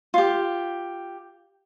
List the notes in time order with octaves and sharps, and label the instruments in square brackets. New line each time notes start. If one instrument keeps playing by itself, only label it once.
[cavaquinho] F4 G4